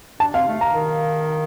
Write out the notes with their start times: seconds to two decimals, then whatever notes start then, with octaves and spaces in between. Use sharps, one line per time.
0.20 D4 A5
0.34 C4 F5
0.48 A3
0.61 A#5
0.75 D#3